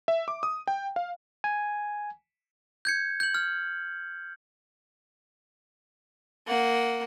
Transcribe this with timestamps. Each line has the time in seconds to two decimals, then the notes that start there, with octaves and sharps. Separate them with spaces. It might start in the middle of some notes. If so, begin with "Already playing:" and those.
0.08 E5
0.28 D6
0.43 D#6
0.67 G5
0.96 F5
1.44 G#5
2.85 G6 G#6 C#7
3.20 G6 F#7
3.34 F6
6.47 A#3 F#5